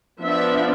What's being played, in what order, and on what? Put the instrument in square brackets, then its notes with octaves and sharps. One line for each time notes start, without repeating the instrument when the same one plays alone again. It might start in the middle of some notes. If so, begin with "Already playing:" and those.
[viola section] F3 B3 D4 E5